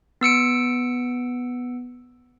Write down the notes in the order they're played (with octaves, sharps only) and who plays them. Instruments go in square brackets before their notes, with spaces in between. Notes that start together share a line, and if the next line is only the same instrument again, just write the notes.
[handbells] B3 E6 C#7 D7